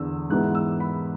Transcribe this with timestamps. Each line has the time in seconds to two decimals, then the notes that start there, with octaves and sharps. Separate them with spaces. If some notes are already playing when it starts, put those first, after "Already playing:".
Already playing: E2 D3 D4 E6
0.30 G#2 E3 B3 F#6
0.55 E6
0.80 B5